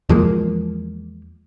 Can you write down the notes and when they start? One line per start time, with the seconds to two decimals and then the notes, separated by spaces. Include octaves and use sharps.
0.09 E2 F3 G#3 A#3